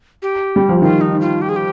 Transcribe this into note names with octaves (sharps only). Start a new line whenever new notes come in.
G4
G3
F3
D#3 F4
D#4
F4
G4
G#4
G4